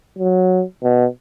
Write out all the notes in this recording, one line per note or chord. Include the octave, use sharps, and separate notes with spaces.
F#3
B2